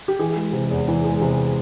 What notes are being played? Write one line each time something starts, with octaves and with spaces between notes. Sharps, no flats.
G4
E3 G#4
G#3
C3
E2
E3
G#3
C3